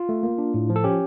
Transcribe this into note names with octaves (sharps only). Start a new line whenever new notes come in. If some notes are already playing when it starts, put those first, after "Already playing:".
Already playing: F4
A3
A#3
D4
A2
F3
A4
C#4 G4